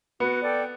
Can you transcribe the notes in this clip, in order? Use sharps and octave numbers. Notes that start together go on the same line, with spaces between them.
B3 F#4
A4 D5 G5